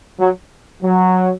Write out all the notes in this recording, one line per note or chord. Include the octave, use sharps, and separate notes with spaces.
F#3
F#3